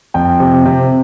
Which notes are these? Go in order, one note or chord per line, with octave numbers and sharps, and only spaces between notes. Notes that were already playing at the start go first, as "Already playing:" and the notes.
F2 G5
C3
C3